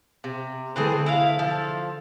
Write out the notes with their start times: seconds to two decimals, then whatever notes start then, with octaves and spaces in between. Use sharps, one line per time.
0.24 C3
0.76 D3 E3 A3 C4 G#4
1.06 E4 F5
1.39 F3 E6 A6